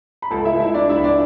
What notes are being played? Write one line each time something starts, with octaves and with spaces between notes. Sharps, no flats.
B5
C#2 A4 A5
E4 E5
C#2
E4 E5
C#2 D4 D5
E4 E5
C#2
D4 D5